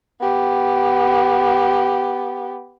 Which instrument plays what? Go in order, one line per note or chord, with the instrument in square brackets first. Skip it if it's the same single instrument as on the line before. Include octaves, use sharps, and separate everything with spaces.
[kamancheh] B3 G4